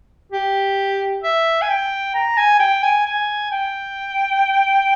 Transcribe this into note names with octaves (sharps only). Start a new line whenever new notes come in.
G4
E5
G#5
G5
A#5
G#5
G5
G#5
G#5
G5